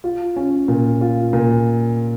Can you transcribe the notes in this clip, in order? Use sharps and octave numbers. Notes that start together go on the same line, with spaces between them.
F4
C#4
A#2
F4
A#2